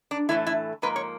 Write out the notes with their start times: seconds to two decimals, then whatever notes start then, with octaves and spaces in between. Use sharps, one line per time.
0.11 D4
0.29 A2 E3 A3 E4
0.47 E4
0.82 G#2 F3 A#3 B4
0.96 C#5